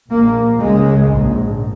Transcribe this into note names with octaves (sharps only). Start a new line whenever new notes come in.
A#1 A#2 A#3
C#2 C#3 G#3
A#1 G#2